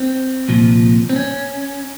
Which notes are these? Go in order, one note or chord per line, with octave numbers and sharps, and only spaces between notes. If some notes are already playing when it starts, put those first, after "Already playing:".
Already playing: C4
C2 A#2 F3
C4
C#4